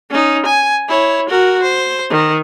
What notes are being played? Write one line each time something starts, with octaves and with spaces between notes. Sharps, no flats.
C#4 D#4
G#5
E4 C#5
F#4 A#4
C5
D#3